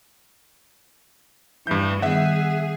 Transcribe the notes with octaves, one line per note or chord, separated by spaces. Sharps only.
G2 E3 G6
D#3 G3 B3 G#4 E5 F#5